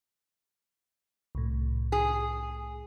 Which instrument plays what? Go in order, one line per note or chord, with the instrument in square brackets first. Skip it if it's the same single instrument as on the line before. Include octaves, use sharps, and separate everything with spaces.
[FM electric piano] C2 A2
[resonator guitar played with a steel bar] G#4